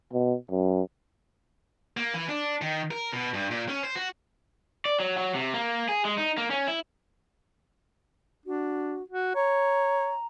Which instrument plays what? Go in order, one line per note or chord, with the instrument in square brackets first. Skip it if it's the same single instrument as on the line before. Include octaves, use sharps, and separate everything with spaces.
[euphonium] B2
F#2
[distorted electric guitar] A#3
E3
D4
D#3
A#4
B2
G2
A#2
C#4
C5
F#4
[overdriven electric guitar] D5
F#3
F#3
C3
A#3
G#4
G#3
D#4
A#3
C#4
E4
[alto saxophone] D4 [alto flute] F#4
[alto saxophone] F#4
[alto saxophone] C#5 [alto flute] A#5